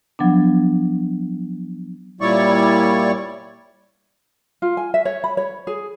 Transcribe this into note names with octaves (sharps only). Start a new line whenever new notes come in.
F3 F#3 B3 D4
A#2 G3 E4 C#5 D5 C#6
F4
G#5
E5
C#5
B5
C#5
G#4